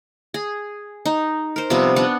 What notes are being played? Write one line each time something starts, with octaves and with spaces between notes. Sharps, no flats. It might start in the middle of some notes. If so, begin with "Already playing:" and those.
G#4
D#4
A#4 C5
C3 F3 G3 B3
B3 D4 F#5